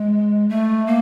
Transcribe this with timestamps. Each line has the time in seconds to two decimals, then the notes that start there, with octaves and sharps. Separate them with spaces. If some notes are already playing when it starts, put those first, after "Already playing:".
Already playing: G#3
0.49 A3
0.86 A#3